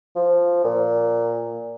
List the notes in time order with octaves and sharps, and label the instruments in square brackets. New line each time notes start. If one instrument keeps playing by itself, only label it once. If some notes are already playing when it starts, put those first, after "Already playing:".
[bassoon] F3
A#2